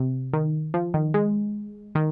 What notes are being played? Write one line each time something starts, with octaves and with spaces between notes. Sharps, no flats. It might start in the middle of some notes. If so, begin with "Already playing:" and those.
Already playing: C3
D#3
F3
D#3
G#3
D#3